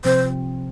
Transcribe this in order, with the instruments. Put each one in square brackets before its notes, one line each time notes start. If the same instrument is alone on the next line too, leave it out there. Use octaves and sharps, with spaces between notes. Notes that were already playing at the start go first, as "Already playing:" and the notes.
[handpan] C3 F3 C4 [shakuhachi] C5